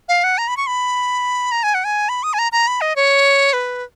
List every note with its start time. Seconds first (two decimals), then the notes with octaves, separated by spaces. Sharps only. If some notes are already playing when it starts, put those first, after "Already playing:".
0.09 F5
0.24 F#5
0.38 A#5
0.48 B5
0.57 C#6
0.67 B5
1.52 A#5
1.63 G#5
1.74 F#5
1.84 G#5
2.09 B5
2.23 D#6
2.33 G#5
2.39 A#5
2.52 A#5
2.67 B5
2.81 D#5
2.96 C#5
3.53 B4